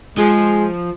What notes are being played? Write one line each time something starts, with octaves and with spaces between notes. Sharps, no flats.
F3 G#3